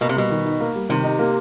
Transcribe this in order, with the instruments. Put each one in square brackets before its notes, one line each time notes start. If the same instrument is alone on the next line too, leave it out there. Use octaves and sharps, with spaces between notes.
[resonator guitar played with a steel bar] B2 [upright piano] A#3
[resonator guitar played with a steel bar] C3
[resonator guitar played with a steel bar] B2 [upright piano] G3
[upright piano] D#3
D#4
A#3
G3
[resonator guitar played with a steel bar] C3 [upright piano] D#3
[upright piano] D#4
A#3